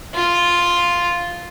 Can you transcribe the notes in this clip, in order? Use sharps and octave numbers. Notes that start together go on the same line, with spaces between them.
F4